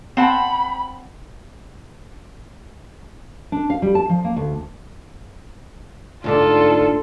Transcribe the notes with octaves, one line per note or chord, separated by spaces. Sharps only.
C4 F#5 A5 B5
D4
F5
G3
A5
F3
A#3
D2
D2 G#2 D4 F4 A4